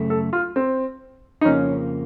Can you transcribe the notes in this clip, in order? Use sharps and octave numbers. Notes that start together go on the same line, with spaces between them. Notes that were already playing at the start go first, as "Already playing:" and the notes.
Already playing: F#2 C#3 A3
A4
F4
C4
D#4
F2 C#3 F3 A#3 C#4